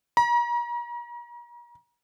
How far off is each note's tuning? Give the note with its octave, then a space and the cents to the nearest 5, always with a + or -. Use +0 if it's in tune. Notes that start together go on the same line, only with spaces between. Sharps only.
A#5 +40